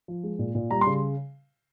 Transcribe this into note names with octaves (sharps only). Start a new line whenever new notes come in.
F3
G#3
A#2
A#2
G3 A#5
C6
C#3